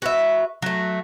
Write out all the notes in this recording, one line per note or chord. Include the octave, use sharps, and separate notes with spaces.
F#4 B4 E5
F#3 A3